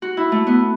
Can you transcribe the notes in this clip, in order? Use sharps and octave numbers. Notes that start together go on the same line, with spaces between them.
F#4
E4
A3
B3